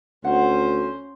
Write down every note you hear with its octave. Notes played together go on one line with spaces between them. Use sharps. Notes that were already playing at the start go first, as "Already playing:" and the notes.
D2 C#4 C5 F#5